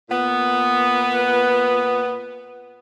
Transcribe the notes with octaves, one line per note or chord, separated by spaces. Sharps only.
A#2 B3